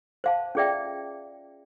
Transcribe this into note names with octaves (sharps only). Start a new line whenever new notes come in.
C5 F5 A5
C#4 F4 G#4 D5 E5 G5